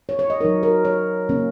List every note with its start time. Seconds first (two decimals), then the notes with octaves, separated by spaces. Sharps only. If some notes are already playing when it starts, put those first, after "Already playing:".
0.09 C#5
0.19 C#5
0.30 D#5
0.41 F#3 D#4 A#4
0.63 A#4
0.85 C#5
1.29 C#3 A#3 C#4